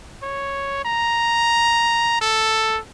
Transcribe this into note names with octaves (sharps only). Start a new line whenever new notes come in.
C#5
A#5
A4